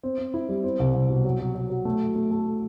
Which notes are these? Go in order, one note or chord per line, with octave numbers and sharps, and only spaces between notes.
C4
C4
E4
G3
C4
C2
C2
B2
F#3
F#3
F#3
F#3
A3
F#3
A3
A3